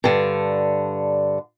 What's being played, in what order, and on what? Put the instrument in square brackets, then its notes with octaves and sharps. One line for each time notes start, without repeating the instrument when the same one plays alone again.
[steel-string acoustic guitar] G2 D3